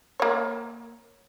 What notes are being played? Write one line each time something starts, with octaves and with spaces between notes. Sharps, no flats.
A#3 C#5